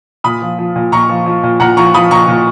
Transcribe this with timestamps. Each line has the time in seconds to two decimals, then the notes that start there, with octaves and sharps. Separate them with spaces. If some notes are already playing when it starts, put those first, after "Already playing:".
0.24 A#2 B5 D#6
0.42 F3
0.59 F3
0.76 A#2
0.92 A#2 A#5 C#6
1.09 F3
1.26 F3
1.43 A#2
1.60 A#2 F#5 A#5
1.77 F3 A#5 C#6
1.94 F3 B5 D#6
2.11 A#2 A#5 C#6
2.28 A#2